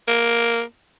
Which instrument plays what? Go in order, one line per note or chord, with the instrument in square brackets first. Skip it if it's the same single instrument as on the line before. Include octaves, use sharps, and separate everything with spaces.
[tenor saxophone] A#3